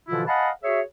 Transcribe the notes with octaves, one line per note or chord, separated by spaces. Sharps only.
B2 D3 E3 F3 E4 F4
D#5 F5 F#5 G#5 A5 B5
F#4 G#4 C#5 E5